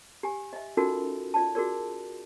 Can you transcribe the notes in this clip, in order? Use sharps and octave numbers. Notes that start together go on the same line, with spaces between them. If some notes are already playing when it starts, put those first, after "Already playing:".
G4 G#5
D#5 E5
C#4 D#4 F4 F#4 A4 A#4
F4 D5 A5
F#4 G#4 A#4 D5